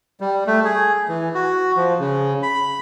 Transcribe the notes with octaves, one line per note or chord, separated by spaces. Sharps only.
G3
A3
G#4
E3
F#4
F3
C#3
B5